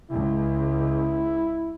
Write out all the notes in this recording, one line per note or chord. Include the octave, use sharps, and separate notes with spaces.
C#2 E4